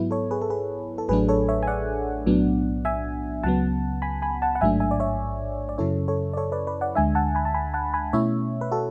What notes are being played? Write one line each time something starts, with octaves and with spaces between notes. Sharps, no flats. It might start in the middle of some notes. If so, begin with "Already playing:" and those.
Already playing: G#2 F#3 B3 E4
A4 C#5
G#4 B4
A4
G#4 B4
A4
A1 A2 F#3 A3 D4 G#4 B4
A4 C#5
C#5 E5
G#5
D5 F#5
B1 A2 F#3 B3 D4
E5 G#5
C#2 C#3 F#3 B3 F#5 A5
G#5 B5
G#5 B5
F#5 A5
F#5
A1 G#2 F#3 A3 D4 E5 G#5
E5 G#5
D5
C#5 E5
D5
F#2 C#3 F#3 C#4 E4 A4 C#5
A4 C#5
D5
A4 C#5
B4 D5
B4 D5
D5 F#5
D2 D3 G#3 D4 E5 G#5
F#5 A5
G#5 B5
A5
G#5 B5
F#5 A5
G#5 B5
B2 A3 C#4 E4 C#5 E5
B4
F#4 A4